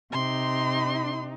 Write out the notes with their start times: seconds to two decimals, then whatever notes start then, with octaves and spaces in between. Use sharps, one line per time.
0.12 C3 D#4 C6